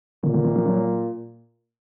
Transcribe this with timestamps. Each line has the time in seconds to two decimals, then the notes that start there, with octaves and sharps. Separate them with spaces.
0.24 A#2 D3
0.34 D3
0.45 D#3
0.56 F3
0.66 F#3